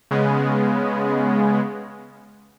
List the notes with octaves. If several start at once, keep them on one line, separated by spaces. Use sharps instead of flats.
C#3 G#3 B3